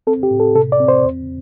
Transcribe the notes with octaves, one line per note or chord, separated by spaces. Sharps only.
C4 A4
G4
A2
A4
C3 A4
D5
C4
C5
E2